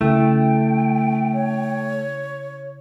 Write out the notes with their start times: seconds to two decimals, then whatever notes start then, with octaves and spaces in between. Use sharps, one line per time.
0.01 C#3 A3 E4 G5
1.34 C#5